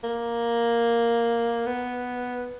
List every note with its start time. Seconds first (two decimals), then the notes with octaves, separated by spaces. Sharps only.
0.04 A#3
1.66 B3